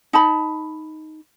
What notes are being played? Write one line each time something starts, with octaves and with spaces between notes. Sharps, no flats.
D#4 A5 B5